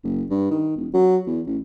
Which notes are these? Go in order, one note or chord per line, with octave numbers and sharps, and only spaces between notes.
F#1
G2
D#3
E1
F#3
E2
A1